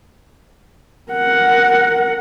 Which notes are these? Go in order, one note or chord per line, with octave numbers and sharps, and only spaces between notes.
A#4 F#5